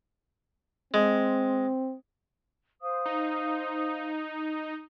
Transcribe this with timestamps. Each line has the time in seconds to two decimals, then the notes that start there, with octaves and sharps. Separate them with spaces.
0.94 G#3 C4
2.82 C5 F5 D#6
3.06 D#4